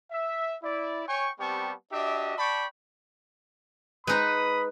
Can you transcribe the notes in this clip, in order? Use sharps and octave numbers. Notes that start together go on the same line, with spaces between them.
E5
E4 D5
C#5 G5 G#5 C#6
G3 B3 C4 G4 A5 C#6
D4 F#4 G4 D#5 E5
D5 G5 A5 B5 C#6
G#3 D#4 B4 B5 D#6